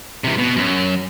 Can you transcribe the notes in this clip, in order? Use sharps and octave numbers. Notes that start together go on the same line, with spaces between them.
C3 E3
B2
F#2 F#3